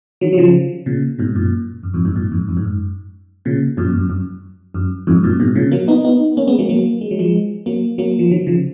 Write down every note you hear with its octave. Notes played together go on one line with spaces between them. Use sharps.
D#3 F#3
F#3
C#3 F3
A#2 C#3
G#2 B2
F#2 A#2
F#2
F2 G#2
F2 G#2
F#2 A#2
F2 G#2
F2
G#2
F#2
A#2 C#3
F#2 A#2
F#2
F#2
F#2
F2 G#2
F#2 A#2
G#2 B2
A#2 C#3
F#3 A#3
B3 D#4
B3 D#4
A#3 C#4
G#3 B3
F#3 A#3
F#3 A#3
G#3
F#3
F3 G#3
F#3 A#3
F#3 A#3
F3
D#3 F#3
C#3 F3